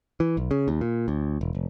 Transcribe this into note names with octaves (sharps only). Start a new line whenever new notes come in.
E3
B1
C#3
D#2
A#2
D2
E1
F1